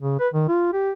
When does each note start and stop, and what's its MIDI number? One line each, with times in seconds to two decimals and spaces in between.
0.01 0.19 49
0.20 0.28 71
0.34 0.45 51
0.48 0.71 65
0.74 0.92 67